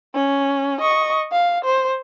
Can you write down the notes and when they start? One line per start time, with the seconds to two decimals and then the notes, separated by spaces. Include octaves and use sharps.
0.15 C#4
0.81 D#5 C#6
1.32 F5
1.65 C5